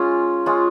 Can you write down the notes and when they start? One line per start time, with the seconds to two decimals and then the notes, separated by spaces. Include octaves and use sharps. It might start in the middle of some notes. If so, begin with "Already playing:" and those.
Already playing: G#3 C#4 F4
0.46 G#3 C#4 F4